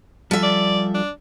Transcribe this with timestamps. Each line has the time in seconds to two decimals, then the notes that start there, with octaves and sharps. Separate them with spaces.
0.31 F3 G3 A4 E5
0.43 D5
0.95 D4